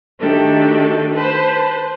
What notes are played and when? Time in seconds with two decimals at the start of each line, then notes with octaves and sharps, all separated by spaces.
0.20 D#3 A3 D4 F#4 G4 A4
1.14 B4 C5 A5